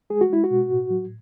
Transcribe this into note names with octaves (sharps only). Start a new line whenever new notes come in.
G#3 G#4
F#4
G#3 E4
F#4
B2
A2
F#3